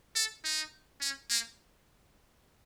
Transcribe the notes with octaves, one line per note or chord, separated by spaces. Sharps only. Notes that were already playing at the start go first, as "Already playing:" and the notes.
A4
D#4
C#4
A#3